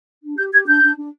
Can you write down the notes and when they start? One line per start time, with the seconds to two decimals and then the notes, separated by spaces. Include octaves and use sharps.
0.22 D4
0.37 G4 G6
0.52 G4 G#6
0.66 D4 G6
0.83 D4
0.97 D4